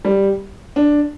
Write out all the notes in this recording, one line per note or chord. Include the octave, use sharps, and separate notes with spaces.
G3
D4